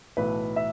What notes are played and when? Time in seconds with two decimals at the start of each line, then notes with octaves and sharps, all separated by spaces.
0.17 B1 A2 E3 B4
0.56 E5